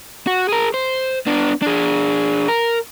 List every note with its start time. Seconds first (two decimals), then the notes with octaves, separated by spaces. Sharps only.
0.27 F#4
0.49 G#4 A#4
0.74 C5
1.27 B3 D4
1.62 D4 G#4
2.48 A#4